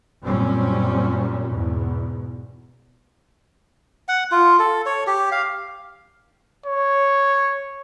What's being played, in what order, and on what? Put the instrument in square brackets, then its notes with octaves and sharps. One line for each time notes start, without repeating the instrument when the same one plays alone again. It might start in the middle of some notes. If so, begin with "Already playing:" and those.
[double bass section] F#2 A#2 G3 C4 C#4
E2 G#2 B2
[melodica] F#5
F4
A4
C#5
G4
F5
[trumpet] C#5